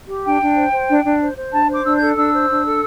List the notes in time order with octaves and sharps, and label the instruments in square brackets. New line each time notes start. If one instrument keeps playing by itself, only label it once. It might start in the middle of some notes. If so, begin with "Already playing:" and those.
[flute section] G4
D4 G5
D4
C5
C5
D4
D4
C5
C5
D4 A5
C5 D6
D4 E6
A4 G6
D4 E6
C5
D4
A4